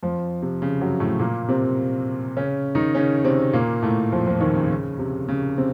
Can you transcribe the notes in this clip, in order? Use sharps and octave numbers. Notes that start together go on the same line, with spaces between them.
F2 F3
C3
C#3
F#2 F#3
A2 A3
A#2 A#3
C3 C4
C#3 C#4
D#3 D#4
C#3 C#4
C3 C4
A#2 A#3
A2 A3
F2 F3
F2 F3
D#2 D#3
C#3
C#3
C3
C#3
C3 C4